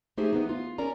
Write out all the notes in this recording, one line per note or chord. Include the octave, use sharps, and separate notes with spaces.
A3 D#4 G4 G#4 C5 E5
E3 B3 D#4
F4
C#4 A#4 D5 A#5